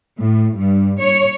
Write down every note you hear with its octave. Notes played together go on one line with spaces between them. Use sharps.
A2
G2
C#5